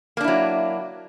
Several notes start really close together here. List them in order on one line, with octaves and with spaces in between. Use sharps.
A#3 D4 E4 F#3